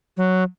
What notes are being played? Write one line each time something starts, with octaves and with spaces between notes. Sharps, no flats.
F#3